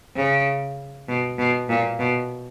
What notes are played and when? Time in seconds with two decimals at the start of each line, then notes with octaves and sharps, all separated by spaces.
0.16 C#3
1.08 B2
1.38 B2
1.69 A#2
1.99 B2